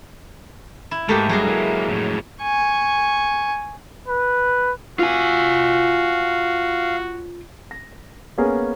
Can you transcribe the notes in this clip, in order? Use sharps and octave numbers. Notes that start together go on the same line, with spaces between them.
E4
G#2 A3 A#3 G4
G2 F#3 G#3 G#4
A#3 E4
F2 A2
G#5 C#6
B4
F4 F#4 F5 G#5
A#6
A#3 B3 C#4 G#4 A#4